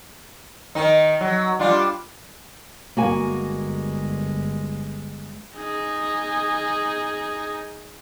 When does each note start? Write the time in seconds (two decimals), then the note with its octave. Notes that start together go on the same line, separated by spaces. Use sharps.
0.75 D#3 D#4
1.21 F#3
1.59 G3 D4 F4
2.97 G1 G#3 A#3 F#4 G#5
5.59 D#4 G#4